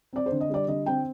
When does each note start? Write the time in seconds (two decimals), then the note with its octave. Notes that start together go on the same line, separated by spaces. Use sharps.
0.13 C4 D5
0.26 C5
0.32 D3
0.41 D#5
0.50 G3 D5
0.68 D3 D#5
0.86 C4 G5